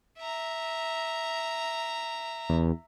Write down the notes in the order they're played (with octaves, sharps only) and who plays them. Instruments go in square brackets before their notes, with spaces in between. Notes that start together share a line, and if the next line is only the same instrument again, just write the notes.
[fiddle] E5 A#5
[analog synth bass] E2